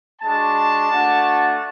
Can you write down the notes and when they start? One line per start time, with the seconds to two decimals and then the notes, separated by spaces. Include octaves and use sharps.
0.22 G#3 D4 F#4 A5
0.90 A3 D4 F#4